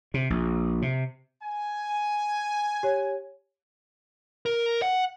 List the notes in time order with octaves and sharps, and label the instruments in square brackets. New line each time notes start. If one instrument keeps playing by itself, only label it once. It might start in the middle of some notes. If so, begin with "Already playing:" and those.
[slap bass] C3
A#1
C3
[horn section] G#5
[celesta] G4 C#5
[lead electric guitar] A#4
F#5